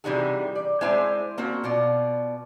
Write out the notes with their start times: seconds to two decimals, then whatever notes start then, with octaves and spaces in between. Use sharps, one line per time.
0.04 C3 E3 G3 D#4 F#4 G#4
0.55 D5
0.81 G#3 C4 E4 C5 D5 G#5
1.38 A#3 C4 C#4 F#4
1.64 B2 F4 D5